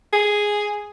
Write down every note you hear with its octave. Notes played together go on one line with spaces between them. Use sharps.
G#4